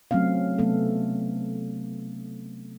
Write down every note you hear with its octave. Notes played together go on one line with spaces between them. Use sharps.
F#3 A3 C4 C#4 F5
C3 F#3 A3 B3 A4